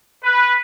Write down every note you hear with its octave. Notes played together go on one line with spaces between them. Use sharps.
B4